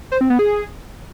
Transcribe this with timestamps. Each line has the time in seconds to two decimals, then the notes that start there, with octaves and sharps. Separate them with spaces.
0.12 C5
0.21 C4
0.30 B3
0.39 G#4